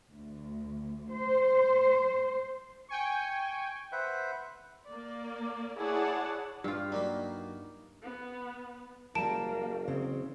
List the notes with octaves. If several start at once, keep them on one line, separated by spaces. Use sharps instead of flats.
D2
C5
G5 G#5 C#6
B4 C5 E5 F#5
A#3 D5
E4 G#4 C#5 D5 F#5 A5
G2 F4 G4 F5
F#3 A#3 D#4 D5 B5
B3
F#1 G3 A#3 A#4 A5 D7 E7
C#3 C4